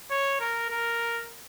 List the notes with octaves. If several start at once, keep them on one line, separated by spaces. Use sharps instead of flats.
C#5
A#4
A#4